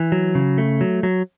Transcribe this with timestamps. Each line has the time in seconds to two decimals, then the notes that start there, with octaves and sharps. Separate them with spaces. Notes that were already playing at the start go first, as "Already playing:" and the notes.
Already playing: E3
0.12 F#3
0.35 C#3
0.58 A3
0.81 F#3
1.03 F#3